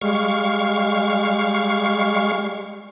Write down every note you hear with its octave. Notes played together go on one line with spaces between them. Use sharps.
G3 G#3 F5 C#6